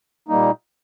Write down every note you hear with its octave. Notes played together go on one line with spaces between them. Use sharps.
A#2 G3 A#3 D#4